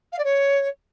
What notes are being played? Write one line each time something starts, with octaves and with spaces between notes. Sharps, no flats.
F5
D5
C#5